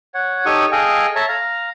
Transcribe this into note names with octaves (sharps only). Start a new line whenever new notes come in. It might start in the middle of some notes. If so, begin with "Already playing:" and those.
C#5 F#5
D#4 G4 A4 C#5 C#6 D#6
G#4 A4 D#5 F5 G5 G#5
A4 C#5 E5 A5 A#5
F5 A#5